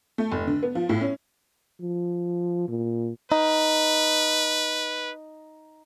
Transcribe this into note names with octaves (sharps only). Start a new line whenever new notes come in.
A3
F1
D3
B3
F3
A2
C#4
F3
A#2
D#4 B4